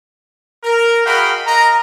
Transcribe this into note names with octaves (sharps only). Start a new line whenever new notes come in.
A#4
F#4 G#4 D#5 F5 G5 B5
A#4 D#5 F5 A#5